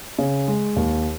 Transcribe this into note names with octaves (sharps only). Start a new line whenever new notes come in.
C#3
G#3
D#2